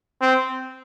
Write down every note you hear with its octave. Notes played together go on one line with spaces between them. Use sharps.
C4